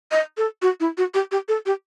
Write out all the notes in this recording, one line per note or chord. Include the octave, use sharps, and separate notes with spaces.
D#5
A4
F#4
E4
F#4
G4
G4
A4
G4